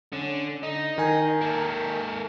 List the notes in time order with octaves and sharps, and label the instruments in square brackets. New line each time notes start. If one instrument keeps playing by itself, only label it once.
[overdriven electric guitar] D3 [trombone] C#4
[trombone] D3 [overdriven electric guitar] D#4
[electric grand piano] D#3 G#5 [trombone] A#4
[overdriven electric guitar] A#3 A4